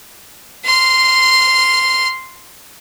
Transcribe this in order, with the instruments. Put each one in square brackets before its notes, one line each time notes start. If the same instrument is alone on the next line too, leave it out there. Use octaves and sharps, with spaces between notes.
[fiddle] C6 F6